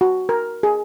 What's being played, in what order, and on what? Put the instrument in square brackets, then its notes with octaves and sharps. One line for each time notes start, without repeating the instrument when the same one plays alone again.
[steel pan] F#4
A#4
G#4